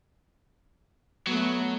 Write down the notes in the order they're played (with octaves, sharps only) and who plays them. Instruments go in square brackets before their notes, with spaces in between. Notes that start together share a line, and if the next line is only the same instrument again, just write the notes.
[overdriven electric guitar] F#3 [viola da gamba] A3 B3